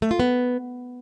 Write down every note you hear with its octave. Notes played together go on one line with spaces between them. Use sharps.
A3
F4
B3